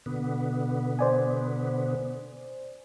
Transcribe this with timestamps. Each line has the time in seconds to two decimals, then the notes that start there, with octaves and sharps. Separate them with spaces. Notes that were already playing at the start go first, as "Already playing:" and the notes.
0.06 B2 D3 B3
0.99 C5 D5 G#5